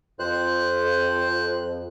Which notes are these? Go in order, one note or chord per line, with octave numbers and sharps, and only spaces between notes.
F2 C5 F#6